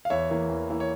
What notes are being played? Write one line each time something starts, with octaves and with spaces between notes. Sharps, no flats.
F5
E2 C#5 E5
E3 A#3
E2
E3 A#3
C#5